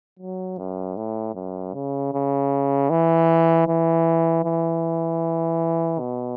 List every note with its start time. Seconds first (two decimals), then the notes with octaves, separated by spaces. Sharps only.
0.19 F#3
0.58 F#2
0.97 A2
1.35 F#2
1.74 C#3
2.13 C#3
2.90 E3
3.68 E3
4.44 E3
6.00 B2